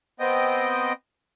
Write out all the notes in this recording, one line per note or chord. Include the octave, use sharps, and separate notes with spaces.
B3 C4 D#5 G5